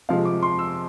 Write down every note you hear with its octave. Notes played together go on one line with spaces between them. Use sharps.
C3 F3 G#3 F5
D6
C6
E6